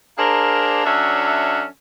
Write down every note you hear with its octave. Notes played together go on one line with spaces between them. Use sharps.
A#3 D4 G#4 A#4 C5 D5
F#3 C#4 D4 A4 E5